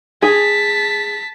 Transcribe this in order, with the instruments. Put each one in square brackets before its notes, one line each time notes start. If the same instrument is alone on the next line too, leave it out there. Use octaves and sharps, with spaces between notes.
[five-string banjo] G#4 [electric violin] A5 B6